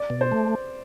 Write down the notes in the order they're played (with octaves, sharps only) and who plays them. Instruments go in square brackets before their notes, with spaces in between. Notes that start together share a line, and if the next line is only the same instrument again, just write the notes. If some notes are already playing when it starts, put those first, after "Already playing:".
Already playing: [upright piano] D5
[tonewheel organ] B2
[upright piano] C5
[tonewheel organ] A3